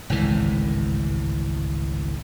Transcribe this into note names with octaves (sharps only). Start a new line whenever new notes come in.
G#1 C#2 A2 E3